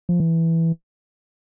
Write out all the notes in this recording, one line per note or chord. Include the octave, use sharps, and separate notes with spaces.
F3
E3